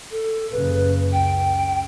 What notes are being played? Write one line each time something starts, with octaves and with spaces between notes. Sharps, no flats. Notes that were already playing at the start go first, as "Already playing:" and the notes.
A4
F#1 C#3 B4
C#2 G5